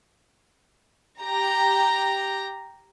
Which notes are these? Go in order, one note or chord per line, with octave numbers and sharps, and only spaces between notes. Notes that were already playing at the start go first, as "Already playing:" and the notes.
G4 A#5